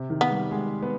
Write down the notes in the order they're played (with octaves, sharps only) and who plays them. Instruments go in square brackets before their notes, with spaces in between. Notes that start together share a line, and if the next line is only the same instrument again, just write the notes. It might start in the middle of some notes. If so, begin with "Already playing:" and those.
Already playing: [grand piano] C3
D#3
[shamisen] B3
[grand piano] G3
G#3
B3